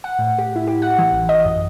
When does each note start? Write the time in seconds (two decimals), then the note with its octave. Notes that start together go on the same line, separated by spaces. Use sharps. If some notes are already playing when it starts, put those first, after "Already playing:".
0.04 F#5
0.19 A2
0.38 G4
0.56 E4
0.67 G4
0.82 F#5
0.99 E3
1.12 A1
1.29 D#5
1.46 F#2